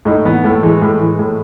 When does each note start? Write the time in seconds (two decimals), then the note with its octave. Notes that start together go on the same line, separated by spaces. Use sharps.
0.05 A2 D#4
0.25 E3 B3
0.44 A2 A3
0.63 E3 G#3
0.81 A2
1.00 E3
1.19 A2